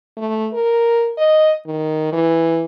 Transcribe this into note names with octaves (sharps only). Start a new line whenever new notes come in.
A3
A#4
D#5
D#3
E3